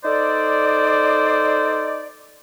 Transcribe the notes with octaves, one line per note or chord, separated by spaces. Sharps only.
D#4 A4 C5 D5